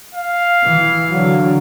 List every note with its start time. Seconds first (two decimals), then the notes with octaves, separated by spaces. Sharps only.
0.14 F5
0.64 E3
1.10 D3 F#3